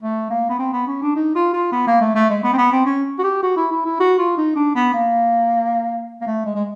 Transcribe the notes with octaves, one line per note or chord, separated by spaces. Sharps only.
A3
A#3
B3
C4
B3
C#4
D4
D#4
F4
F4
B3
A#3
A3
A3
G#3
B3
C4
B3
C4
C#4
F#4
G4
F#4
E4
E4
E4
F#4
F4
D#4
D4
B3
A#3
A#3
A3
G#3
G#3